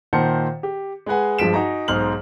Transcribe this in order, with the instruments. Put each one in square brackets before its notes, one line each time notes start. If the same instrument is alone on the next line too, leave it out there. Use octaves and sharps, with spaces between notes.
[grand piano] A#2 D#3 C5 F#5 A5 C#7
G4
G#3 G#4 B4 F#5 G#5
G2 F3 G#3 B6 D7 E7
D#4 F#4 G#5 A#5
B1 G#2 D#4 C5 F6 F#7